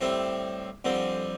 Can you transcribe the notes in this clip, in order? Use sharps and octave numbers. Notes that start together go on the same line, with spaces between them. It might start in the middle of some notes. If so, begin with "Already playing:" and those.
A2 G3 C4 E4
F2 D3 G3 C4